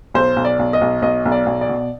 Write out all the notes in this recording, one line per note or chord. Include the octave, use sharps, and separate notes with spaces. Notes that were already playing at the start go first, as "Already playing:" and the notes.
B1 C5
B1
D5
B1
D#5
B1
B1 D#5
B1
D5
B1
D5
B2